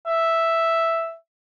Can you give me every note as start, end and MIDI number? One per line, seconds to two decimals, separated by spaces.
0.06 1.13 76